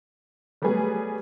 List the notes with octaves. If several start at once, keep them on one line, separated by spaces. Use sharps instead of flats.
F#3 G3 A3 B3 G#4